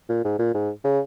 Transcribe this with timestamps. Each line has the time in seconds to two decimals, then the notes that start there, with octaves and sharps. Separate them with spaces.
0.09 A#2
0.24 G#2
0.39 A#2
0.54 G#2
0.84 C#3